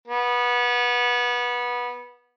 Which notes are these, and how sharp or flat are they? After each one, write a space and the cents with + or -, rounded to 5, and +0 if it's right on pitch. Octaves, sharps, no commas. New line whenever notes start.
B3 -20